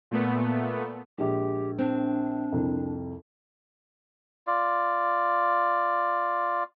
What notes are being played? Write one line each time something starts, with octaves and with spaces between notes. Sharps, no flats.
A#2 A3 B3
A#1 G#3 G4
C4 D4
C2 F2
F4 D5